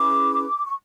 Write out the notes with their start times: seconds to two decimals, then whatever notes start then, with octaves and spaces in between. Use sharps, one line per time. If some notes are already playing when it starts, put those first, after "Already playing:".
Already playing: C#4 E4 G#4 B4 D6
0.65 C#6